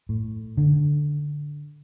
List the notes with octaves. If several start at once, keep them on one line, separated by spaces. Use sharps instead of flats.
A2
D3